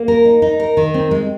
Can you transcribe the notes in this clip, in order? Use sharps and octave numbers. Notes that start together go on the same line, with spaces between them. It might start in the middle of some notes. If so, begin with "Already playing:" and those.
Already playing: A#3
A#4
D#4
D#4
A#4
D#3
C4
G#3